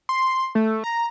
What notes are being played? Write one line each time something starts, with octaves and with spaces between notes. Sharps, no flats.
C6
A3
A#5